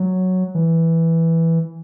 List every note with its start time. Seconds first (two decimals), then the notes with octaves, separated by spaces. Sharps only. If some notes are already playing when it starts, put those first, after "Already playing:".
Already playing: F#3
0.55 E3